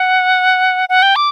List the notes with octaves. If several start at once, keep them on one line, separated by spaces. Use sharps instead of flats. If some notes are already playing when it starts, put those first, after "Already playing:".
Already playing: F#5
F#5
G5
D6